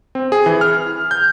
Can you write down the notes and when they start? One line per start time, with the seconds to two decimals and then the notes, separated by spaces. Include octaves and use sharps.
0.15 C4
0.32 G#4
0.46 E3
0.61 F6
1.11 G6